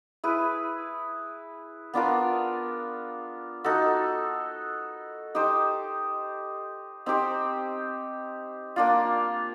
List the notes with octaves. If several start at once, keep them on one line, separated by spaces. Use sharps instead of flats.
E4 G#4 B4
B3 D4 F4 A#4
D#4 F#4 A4
D#4 G4 C5 D#5
C4 D#4 G4 C5
A#3 D4 F4